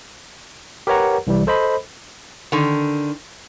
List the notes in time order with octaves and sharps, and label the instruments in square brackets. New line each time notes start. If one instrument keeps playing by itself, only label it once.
[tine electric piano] G4 A#4 B4 C#5 F#5 A#5
C2 E3 G3
A4 C5 D#5 B5
[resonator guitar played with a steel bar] D3 D#3